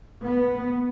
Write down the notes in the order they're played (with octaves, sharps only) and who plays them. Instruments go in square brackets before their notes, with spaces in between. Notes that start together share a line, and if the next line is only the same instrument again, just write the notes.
[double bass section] B3